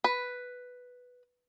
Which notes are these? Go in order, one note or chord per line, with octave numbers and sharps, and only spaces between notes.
B4